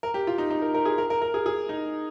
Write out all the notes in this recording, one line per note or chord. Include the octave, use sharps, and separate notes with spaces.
A#4
G4
F4
D#4
D#4
A#4
A#4
G#4
A#4
A#4
A#4
G#4
G#4
D#4